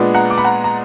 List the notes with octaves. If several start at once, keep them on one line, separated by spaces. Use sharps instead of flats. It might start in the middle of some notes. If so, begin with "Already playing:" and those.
Already playing: A#2 G#3 B3 D4
F#5 A#5
D6
B5
F#5 A#5
A#5